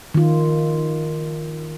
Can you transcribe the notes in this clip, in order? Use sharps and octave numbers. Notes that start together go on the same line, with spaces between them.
D#3 F4